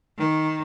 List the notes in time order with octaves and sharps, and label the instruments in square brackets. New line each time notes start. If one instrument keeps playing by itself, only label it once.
[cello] D#3